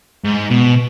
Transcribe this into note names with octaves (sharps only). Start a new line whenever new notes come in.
G#2
B2